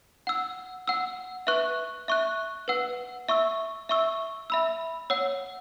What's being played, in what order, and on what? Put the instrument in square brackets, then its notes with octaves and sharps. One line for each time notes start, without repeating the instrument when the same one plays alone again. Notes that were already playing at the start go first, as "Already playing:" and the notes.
[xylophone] F#5 E6
F#5 E6
B4 E5 C#6 F#6
E5 C#6 F#6
B4 F#5 E6
E5 C#6 E6
E5 C#6 E6
E5 B5 E6
C#5 F#5 E6